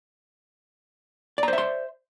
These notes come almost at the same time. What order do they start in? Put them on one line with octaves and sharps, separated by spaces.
D5 A#5 C5 E5 C6